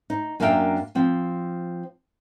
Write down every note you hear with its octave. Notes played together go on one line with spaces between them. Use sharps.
D#4
F#2 A#3 D4 E5 F5 G5
F3 C4